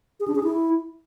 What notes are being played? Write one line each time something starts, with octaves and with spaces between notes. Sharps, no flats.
G#4
D4
G#4
E4